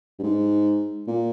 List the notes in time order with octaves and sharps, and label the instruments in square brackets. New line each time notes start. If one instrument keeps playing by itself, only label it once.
[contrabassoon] G2
G#2
A#2